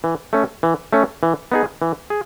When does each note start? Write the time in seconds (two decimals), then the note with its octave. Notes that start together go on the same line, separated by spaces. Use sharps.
0.04 E3
0.33 A3 C#4
0.63 E3
0.93 A3 C#4
1.23 E3
1.52 B3 D#4 G#4
1.82 E3
2.10 G#4